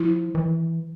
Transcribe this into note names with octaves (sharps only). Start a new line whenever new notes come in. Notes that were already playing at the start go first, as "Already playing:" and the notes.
Already playing: F3 E4
E3